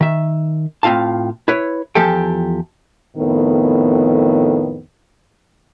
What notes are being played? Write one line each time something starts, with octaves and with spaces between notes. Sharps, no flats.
D#3 E5
A2 C4 F4 F5 A5
E4 B4 C#5
E2 F3 G4 A4 G5
F2 A2 D#3 B3